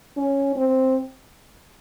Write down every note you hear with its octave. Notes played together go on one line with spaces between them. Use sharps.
C#4
C4